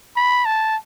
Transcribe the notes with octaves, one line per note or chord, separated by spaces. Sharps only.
B5
A5